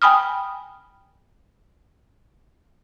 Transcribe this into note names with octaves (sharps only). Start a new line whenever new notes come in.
G5 G#5 B5 D#6 F6